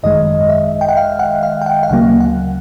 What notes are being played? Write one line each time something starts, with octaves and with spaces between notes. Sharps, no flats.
G#1 F#2 D#3 G#3 D#5
E5
G5
F#5
F5
F#5
F5
G5
F#5
F5
D2 C#3 F#3 A#3 F#5
F#5